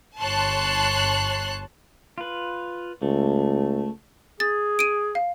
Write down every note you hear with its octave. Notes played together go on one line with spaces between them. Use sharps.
G1 C#5 A5 C6 F#6
F4 B4
C#2 A3
G#4 A6
D7 D#7
F5